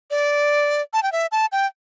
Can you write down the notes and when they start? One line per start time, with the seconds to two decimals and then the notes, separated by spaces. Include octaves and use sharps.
0.11 D5
0.93 A5
1.03 G5
1.12 E5
1.32 A5
1.52 G5